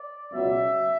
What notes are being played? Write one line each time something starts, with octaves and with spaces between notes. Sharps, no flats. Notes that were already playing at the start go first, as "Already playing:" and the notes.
Already playing: D5
C#2 B2 F#3 E5